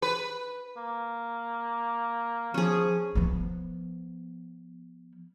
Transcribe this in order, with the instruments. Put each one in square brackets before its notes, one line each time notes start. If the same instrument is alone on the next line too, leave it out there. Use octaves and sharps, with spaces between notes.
[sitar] B4
[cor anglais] A#3
[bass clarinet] F3 [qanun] C#4 G#4
[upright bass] F3 B3